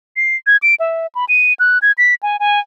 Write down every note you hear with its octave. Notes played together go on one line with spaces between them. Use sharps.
C7
G#6
D7
E5
B5
D#7
F#6
G#6
B6
G#5
G#5